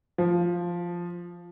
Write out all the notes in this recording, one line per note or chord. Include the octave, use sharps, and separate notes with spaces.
F3